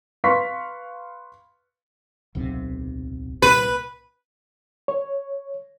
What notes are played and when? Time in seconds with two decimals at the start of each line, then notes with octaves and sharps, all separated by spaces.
0.24 B4 F5 C6 C#6 B6
2.35 D1 B1 C3
3.42 C2 A#2 B4
4.88 C#5